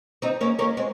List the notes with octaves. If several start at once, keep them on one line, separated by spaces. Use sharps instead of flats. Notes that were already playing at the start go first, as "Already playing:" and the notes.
C4 D#4
A#3 C#4
A#3 C#4
G#3 C4